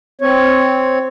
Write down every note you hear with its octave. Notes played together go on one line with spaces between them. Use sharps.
C4 C#5